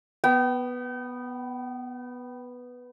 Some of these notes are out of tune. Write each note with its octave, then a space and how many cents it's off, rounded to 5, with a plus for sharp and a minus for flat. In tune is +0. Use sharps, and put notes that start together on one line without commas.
B3 +0 G5 -40